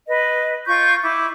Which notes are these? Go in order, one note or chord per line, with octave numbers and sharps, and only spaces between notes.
B4 D#5
F4 C#6 G6
E4 D6